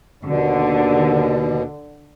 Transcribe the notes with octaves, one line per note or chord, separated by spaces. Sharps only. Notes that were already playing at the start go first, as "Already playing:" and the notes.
D#2 B2 D3